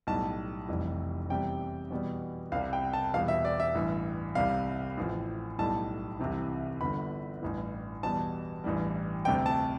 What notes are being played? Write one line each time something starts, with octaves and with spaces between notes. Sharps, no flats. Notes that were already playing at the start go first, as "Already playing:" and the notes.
B1 A2 G3 A5
F1 F2 E3 G3
E2 C3 G3 G5
E2 B2 G3
C2 C3 G3 F5
G5
A5
E1 E2 B2 G3 F5
E5
D5
E5
A1 G2 E3
C2 C3 G3 F5
A1 A2 F3
B1 A2 G3 A5
C2 C3 E3
G1 G2 D3 B5
A1 G2 E3
E2 B2 G3 A5
A1 G2 E3 G3
D2 C3 G3 G5
A5